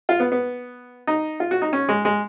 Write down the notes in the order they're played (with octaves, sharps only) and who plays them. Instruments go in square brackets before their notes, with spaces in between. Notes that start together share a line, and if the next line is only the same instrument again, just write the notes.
[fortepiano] F4
B3
B3
D#4
F4
F#4
D#4
C#4
G#3
G#3